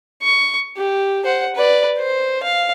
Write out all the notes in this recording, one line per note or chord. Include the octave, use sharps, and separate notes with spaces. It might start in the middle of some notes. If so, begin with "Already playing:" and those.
C#6
G4
C5 F#5
B4 D5
C5
F5